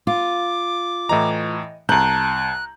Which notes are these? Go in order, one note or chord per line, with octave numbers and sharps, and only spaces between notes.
F4 D6
A2 E3 D#5 A#5
C2 A5 A#5 F#6 G6 F#7